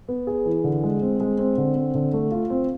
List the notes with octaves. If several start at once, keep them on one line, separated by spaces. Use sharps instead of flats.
B3
G#4
E3
D3
G#3
C4
G#3
C4
D3
C4
D3
A3
F4
C4